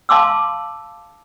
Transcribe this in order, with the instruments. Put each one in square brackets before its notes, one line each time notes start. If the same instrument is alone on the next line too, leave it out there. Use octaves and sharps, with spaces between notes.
[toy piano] F5 A5 C6 D6 E6